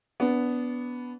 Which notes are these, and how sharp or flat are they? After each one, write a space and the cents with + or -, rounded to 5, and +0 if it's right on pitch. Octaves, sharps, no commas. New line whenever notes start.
B3 +0 D4 -25